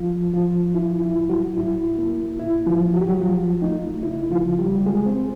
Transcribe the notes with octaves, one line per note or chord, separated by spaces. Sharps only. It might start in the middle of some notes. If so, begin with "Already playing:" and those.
Already playing: F3 F4
A2 F3 F4
F3 E4
E4
A2
F#3 F#4
A2 E4
A#3
A2 E4
F3 F4
A2
F#4
G4
F#3 F#4
F2 F3 F4
A3 D#4
C#3 E4
F3 F4
C#3
G3 G4
F2 G#3 G#4
C4 C5